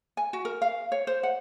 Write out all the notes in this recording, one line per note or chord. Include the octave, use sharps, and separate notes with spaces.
G#5
F#4
A#4
F5
C#5
C5
F#5